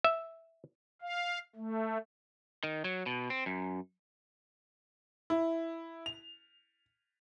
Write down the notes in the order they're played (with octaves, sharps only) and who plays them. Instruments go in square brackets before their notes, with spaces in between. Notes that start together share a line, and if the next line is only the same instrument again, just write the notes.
[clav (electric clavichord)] E5
[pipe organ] F5
A3
[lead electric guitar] D#3
F#3
B2
C4
F#2
[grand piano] E4
F7